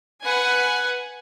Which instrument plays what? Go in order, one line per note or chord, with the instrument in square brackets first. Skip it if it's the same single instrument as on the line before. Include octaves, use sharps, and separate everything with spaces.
[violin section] B4 F#5 G#5